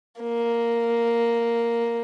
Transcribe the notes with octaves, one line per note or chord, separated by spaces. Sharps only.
A#3